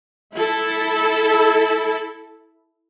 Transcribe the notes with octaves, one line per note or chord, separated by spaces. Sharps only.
E4 A4